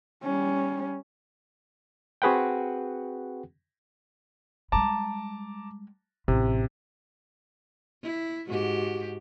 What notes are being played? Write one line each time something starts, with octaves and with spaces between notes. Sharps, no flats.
G3 C#4
C4 F#4 G#4 B4 F#5 G5
G3 G#3 A5 A#5 D6
A1 C3
E4
G#2 F#4 G4